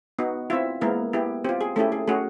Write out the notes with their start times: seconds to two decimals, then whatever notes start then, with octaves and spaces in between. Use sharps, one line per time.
0.19 B3 D#4 F#4
0.50 C4 E4 F4 E5
0.81 G#3 A#3 B3 E4 A#4
1.13 B3 E4 G4
1.45 C4 G4
1.49 F4
1.61 G#4
1.76 A3 C#4 E4 G4 A4
1.92 G#4
2.08 A3 C#4 F#4 G#4